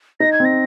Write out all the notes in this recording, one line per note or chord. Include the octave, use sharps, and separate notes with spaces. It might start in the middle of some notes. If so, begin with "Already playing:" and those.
D#4 A#6
G#6
C4 A#6